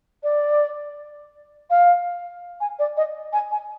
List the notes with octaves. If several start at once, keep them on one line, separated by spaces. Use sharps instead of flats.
D5
F5
G#5
D5
D#5
G#5
G#5